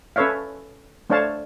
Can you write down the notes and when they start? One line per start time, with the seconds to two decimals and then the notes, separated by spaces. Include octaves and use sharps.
0.16 C#4 A4 B4 C#5 E5 F5
1.10 A3 D4 C5 C#5 F5 A5